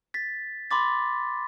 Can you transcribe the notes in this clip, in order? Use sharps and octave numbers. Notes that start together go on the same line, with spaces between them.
A6 B6
B5 C6 D6 A6